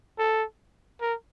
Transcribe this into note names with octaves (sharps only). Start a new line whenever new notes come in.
A4
A#4